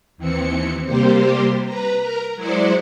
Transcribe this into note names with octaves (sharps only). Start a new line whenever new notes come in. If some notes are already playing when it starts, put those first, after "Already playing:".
D#2 E3 C4 C#7
C3 G3 A#3 G4 C5
B4 A#5
A#4 A#5
F#3 G#3 E4 C5 D5 C#7